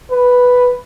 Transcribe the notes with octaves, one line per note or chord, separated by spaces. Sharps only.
B4